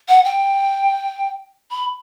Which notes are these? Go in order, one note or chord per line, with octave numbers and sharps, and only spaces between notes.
F#5
G5
B5